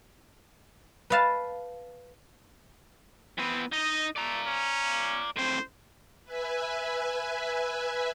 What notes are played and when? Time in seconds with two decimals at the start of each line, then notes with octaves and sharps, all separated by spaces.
1.10 B4 F5 A5
3.38 E3 B3 C4
3.72 D#4 D#5
4.16 A3 D5 A#5
4.47 C#4
5.36 A2 C4 C5
6.25 B4 E5 G#5